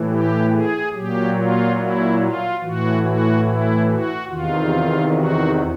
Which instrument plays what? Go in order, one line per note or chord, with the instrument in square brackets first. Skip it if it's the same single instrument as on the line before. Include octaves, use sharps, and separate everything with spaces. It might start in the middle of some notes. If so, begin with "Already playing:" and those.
Already playing: [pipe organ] A2 E3
G4
G#4
A#2 F#3 G4
F4
E4
F4
A2 E3 F#4
F#4
E4
F#4
E2 C3 D#3 F4
F#4